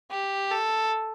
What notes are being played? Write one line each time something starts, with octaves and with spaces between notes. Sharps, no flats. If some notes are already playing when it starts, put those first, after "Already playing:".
G4
A4